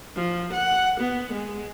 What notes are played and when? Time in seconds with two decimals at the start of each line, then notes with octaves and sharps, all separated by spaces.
0.16 F3
0.53 F#5
1.00 B3
1.33 G#3